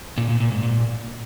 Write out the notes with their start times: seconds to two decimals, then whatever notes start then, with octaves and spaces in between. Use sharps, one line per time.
0.18 A#2
0.29 A#2
0.40 A#2
0.52 G#2
0.63 A#2